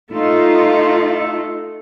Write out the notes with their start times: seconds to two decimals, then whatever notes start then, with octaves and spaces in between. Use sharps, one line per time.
0.12 A3 D#4 F4 A4